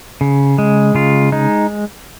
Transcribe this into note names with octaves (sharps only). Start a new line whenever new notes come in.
C#3
G#3
C#3 F4
G#3 D#4